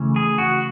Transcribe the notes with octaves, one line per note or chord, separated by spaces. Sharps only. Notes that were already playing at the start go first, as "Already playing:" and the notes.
Already playing: C#3 E3 A3 C#4
G#4
F#4